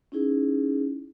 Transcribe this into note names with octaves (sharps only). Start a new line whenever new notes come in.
C#4 D#4 E4 G#4